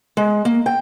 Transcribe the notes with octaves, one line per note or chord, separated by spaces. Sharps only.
G#3
A#3
G5